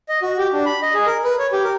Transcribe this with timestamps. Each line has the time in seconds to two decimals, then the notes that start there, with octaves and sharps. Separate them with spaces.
0.09 D#5
0.22 F#4
0.38 G4
0.53 D4
0.66 B5
0.82 D#5
0.94 G#4
1.06 A#4
1.24 B4
1.39 C#5
1.52 G4
1.64 A#4